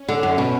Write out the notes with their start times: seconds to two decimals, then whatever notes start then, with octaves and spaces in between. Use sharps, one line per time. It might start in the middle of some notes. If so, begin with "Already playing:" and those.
Already playing: C#4
0.08 D3
0.23 F#2
0.38 B2